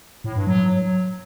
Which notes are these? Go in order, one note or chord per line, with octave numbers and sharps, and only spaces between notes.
A2
G2
F#3